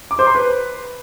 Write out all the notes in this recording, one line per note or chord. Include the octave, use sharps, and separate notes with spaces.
D6
C5
C6
B4